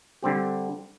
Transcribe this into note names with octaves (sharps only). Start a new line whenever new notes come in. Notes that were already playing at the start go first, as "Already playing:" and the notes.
D3 G3 C4 G4